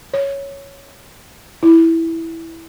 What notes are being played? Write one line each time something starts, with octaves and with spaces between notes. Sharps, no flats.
C#5
E4